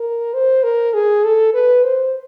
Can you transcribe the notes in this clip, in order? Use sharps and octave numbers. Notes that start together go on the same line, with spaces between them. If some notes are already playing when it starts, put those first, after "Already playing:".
Already playing: A#4
C5
A#4
G#4
A4
B4
C5